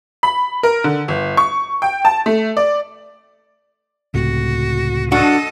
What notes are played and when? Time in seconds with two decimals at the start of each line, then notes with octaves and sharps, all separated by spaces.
0.23 B5
0.63 A#4
0.84 D3
1.08 G1
1.37 C#6
1.82 G5
2.05 A5
2.26 A3
2.57 D5
4.14 C#2 A2 C3 F#4
5.12 G2 D4 F#4 A4 D#5